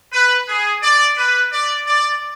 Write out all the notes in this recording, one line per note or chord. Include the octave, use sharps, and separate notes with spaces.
B4
G#4
D5
B4
D5
D5